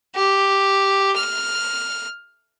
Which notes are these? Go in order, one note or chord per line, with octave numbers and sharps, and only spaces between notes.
G4
F6